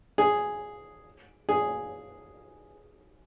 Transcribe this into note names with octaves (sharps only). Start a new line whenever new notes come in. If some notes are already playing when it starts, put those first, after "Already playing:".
G#4
G#4